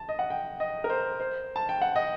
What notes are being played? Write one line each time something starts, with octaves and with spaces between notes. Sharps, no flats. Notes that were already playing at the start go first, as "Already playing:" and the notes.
Already playing: A5
D#5
F#5
G5
D#5
A#4
C5
C5
A5
G5
F#5
D#5